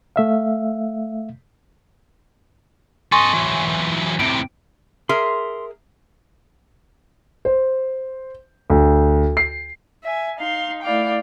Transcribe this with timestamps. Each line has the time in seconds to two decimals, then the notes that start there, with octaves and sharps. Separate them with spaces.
0.16 A3 E5 F5
3.12 A4 D#5 G#5 C6 C#6
3.34 E3 F#3
4.20 A2 C3 D7
5.09 G#4 A#4 E5 C6
7.45 C5
8.70 D2
9.37 C7
10.04 E5 G#5
10.38 D#4 F5 C6
10.83 A3 E4 D5 F5 G5